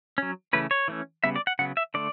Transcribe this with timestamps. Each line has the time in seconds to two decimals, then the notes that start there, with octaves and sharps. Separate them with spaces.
0.18 F#3 C#4
0.53 C#3 E3 A3 C#4 B4
0.71 C#5
0.88 E3 A3 C#4
1.24 C#3 G3 B3 E5
1.36 D5
1.47 F#5
1.59 C#3 F#3 B3 F#5
1.77 E5
1.94 D3 A3 D5